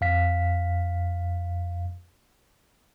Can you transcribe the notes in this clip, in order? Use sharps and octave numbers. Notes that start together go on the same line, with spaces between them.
F2 F5 B6